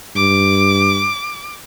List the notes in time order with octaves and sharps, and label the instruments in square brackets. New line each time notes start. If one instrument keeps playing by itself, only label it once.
[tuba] G2 [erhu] D6